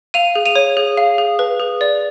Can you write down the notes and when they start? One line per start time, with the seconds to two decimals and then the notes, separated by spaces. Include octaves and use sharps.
0.14 F5 D#7 F7
0.35 G#4
0.46 D#7 F7
0.56 C#5
0.77 G#4
0.97 F5
1.18 G#4
1.39 B4
1.60 G#4
1.81 D5